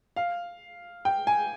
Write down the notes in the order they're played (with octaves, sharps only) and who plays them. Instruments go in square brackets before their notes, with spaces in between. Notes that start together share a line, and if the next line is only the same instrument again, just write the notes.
[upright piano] F5
G5
G#5